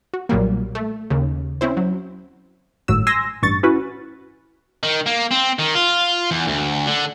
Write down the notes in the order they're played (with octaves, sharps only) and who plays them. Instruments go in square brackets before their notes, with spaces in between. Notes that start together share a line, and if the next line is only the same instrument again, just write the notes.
[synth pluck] F#4
B1 A#2 F#3 G3 A#3
A3
D#2 C#3
C4 C#4 E4 C5
F#3
[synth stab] G#1 A2 F#3 E6
G#5 C6 E6 A#6
A1 G2 C#6 A6
C#4 E4 F#4 B4
[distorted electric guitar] D#3
A#3
C4
D#3
F4
E2
D2
D3